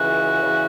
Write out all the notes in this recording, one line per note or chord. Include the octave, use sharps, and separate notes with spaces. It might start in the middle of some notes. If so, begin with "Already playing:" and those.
Already playing: C#2 C#3 E3 F#4
E2 C#3 E3